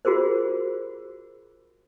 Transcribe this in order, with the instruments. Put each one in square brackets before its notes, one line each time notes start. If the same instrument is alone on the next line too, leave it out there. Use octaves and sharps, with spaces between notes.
[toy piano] F4 F#4 G#4 A#4 C5